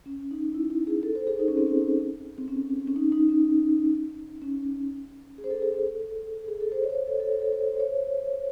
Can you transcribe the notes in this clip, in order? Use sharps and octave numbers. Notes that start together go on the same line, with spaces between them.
C#4
D#4
E4
E4
G#4
A4
C5
G#4
D#4
C#4
C4
C#4
C4
C#4
C#4
D#4
D#4
C#4
C#4
G#4
C5
A4
G#4
A4
G#4
A4
C5
C#5
C5
C#5
A4
A4
C5
A4
C5
C5
C#5